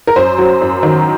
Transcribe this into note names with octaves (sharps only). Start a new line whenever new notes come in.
A#4
F#2 C5
F#3
F#2
D#3